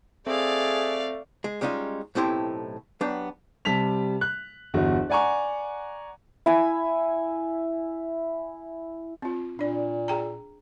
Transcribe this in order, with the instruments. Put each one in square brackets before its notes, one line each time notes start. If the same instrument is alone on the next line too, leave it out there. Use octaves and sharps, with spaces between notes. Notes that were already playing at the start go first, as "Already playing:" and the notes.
[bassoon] A3 [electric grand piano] C4 [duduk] G#4 [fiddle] D5 F5
[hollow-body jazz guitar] G#3
G3 G#3 C#4 D#4 F4
B1 A2 C4 E4 G4 C6
F#3 B3 D4 G4
[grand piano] C3 G3 A5 B6 F7
F#6
G1 E2 F#4
D5 F#5 G#5 A#5 C#6
[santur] E4 G#5
[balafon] C4 F4
[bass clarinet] A#2 [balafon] D4 D5
[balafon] G#4 G5 A#5